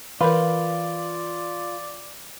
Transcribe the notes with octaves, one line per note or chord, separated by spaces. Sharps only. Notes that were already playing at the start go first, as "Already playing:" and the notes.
E3 F4 A#4 B4 D5